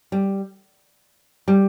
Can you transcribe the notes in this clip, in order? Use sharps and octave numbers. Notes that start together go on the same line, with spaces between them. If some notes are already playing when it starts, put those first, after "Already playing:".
G3
G3